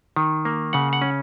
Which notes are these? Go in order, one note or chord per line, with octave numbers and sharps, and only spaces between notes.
D#3
A#3
C#3 F#5
F#5
C#4